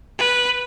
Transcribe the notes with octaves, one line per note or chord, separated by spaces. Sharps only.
B4